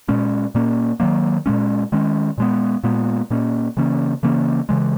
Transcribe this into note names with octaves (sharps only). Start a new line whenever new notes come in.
A#2 G#3 C#4
A#2 A#3 C#4
D#3 F#3 A#3
A#2 G#3 C#4
D#3 G#3 C#4
A#2 G#3 B3
A#2 G#3 B3
A#2 A#3 C#4
C#3 E3 A#3 C#4
C#3 E3 A#3 C#4
C#3 E3 G#3